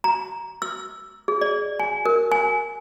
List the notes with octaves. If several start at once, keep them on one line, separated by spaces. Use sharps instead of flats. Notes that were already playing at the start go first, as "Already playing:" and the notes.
A#5
E6
G#4
D5
G#5
A#4
G#5